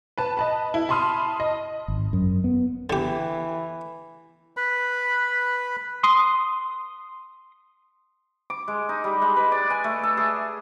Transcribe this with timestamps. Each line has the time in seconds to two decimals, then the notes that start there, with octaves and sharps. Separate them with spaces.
0.18 B4 A5
0.37 D#5 A5 B5
0.74 E4
0.89 A5 B5 C6 D#6 F6
1.40 D#5
1.88 G#1
2.13 F#2
2.44 B3
2.90 D3 E3 G4
4.57 B4 B5
6.03 C6 D#6
8.50 D6
8.68 G#3
8.89 D#4
9.04 G3
9.22 G#3
9.36 B4
9.52 D5
9.70 G#5
9.84 A3
10.03 A4
10.17 G#4